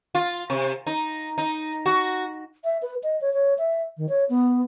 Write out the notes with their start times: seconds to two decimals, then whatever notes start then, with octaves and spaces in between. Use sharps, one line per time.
0.15 F4
0.50 C3
0.87 D#4
1.38 D#4
1.86 F#4
2.64 E5
2.82 B4
3.03 D#5
3.21 C#5
3.33 C#5
3.58 E5
3.97 D#3
4.09 C#5
4.29 B3